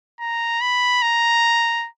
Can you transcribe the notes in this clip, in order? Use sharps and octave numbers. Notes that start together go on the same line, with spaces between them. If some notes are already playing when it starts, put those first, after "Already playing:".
A#5
B5
A#5